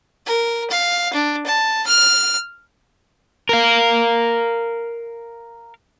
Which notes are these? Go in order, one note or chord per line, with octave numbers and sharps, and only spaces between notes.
A#4
F5
D4
A5
F6
A#4 F5